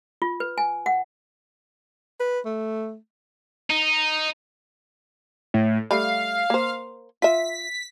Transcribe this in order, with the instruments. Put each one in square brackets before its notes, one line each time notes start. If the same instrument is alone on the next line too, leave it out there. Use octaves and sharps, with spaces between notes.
[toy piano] F4
B4
G#5
F#5
[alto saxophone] B4
A3
[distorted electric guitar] D#4
[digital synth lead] A2
[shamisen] G3 A3 [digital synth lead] F5
[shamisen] A#3 C5
[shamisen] F4 E5 [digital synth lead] B6